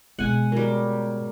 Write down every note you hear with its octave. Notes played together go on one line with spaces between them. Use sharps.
G#2 B2 G#3 B3 F#5 G#5
F#3 G3 A#4